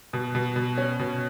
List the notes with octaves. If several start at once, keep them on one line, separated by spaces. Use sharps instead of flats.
B2
B2
B2
C#4
B2